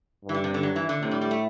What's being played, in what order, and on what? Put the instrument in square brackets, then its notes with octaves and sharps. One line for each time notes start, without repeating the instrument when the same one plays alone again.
[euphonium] G2 [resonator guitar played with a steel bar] E3
[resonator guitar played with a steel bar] D3
C3
D3
F#3
E3
D3
[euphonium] A2 [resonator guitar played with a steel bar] C3
[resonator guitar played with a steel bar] G3
G3
A3